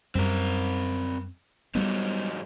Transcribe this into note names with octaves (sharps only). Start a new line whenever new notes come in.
F#2 G3 C4 A#4
G#2 F#3 G3 B3 D#4